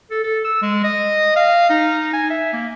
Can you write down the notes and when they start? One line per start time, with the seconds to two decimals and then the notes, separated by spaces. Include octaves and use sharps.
0.11 A4
0.24 A4
0.45 E6
0.62 G#3
0.84 D#5
1.36 F5
1.70 D#4
2.13 G#5
2.30 E5
2.53 A#3